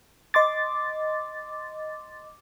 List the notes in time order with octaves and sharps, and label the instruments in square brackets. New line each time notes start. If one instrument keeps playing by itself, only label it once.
[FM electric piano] D#5 C6 D6 A6